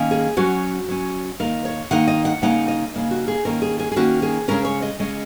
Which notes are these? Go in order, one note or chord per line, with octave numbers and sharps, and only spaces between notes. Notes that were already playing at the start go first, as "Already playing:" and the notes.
Already playing: D#3 A#3 C#4
G#4
F#3 C#4 F#4
F#3 C#4
D#3 A#3 D#4 A#4
C#5
D#3 A#3 D#4 F#5
D#5
F#5
C#3 A#3 D#4 F#5
D#5
C#3 A#3 D#4
F#4
G#4
D#3 A#3 C#4 A#4
G#4
G#4
G#4
D#3 A#3 C#4 F#4
G#4
C#3 G#3 C#4 A#4
C#5
D#5
C#3 G#3 C#4 D#5